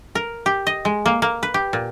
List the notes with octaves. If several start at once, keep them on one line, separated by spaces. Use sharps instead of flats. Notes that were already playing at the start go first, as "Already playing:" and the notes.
A#4
G4
D#5
G#3
A#3
A#3
B4
G4
A#2